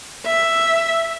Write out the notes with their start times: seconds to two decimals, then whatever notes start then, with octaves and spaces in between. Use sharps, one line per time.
0.26 E5